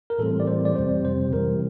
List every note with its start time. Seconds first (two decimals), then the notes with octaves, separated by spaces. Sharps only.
0.10 A#4
0.19 A2 E3 G3 C4 A4
0.40 D5
0.47 C5
0.65 D5
0.75 F2 C3 G3 C4 C5
1.05 C5
1.33 C3 E3 G3 A#4